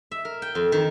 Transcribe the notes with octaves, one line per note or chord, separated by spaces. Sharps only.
E5
A#4
G5
F2
D#3